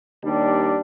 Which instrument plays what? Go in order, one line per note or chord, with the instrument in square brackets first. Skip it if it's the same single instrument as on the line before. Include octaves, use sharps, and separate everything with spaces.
[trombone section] D#2 G3 D4